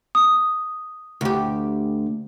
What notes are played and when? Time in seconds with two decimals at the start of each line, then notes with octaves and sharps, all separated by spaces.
0.15 D#6
1.21 D2 G4